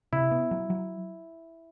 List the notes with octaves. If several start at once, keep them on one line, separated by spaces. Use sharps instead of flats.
C3 E4
B3
F#3
F#3